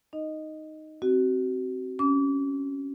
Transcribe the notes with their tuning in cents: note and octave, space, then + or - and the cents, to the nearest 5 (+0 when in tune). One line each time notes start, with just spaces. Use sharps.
D#4 +0 D#5 +0
C4 +0 F#4 +30
C#4 +0 D6 -35